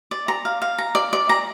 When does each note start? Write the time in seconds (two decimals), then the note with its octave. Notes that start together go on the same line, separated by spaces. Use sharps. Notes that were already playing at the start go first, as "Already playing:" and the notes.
0.11 D5
0.28 A#5
0.45 F5
0.62 F5
0.78 A#5
0.95 D5
1.13 D5
1.29 A#5